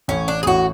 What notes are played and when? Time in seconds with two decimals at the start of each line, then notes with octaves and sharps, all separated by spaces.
0.08 A1 C#4
0.28 D4
0.43 G#4
0.46 A1 F#4